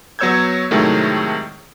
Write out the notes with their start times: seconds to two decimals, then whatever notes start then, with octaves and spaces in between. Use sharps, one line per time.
0.19 F#3 B3 C#5 E6 G6 G#6
0.71 A2 C3 D#3 F#3 G#3 A3